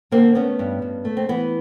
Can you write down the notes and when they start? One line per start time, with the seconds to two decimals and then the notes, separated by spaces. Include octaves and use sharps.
0.11 D3 A#3 C4
0.35 A3 B3 C#4
0.59 G2
0.82 G2
1.05 A3
1.17 C4
1.29 E3 B3